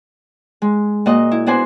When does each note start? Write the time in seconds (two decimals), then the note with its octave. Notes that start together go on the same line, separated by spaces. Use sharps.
0.62 G#3
1.06 A#2 F#4 D#5
1.31 E4
1.46 B3 D4 F#4 C5 G#5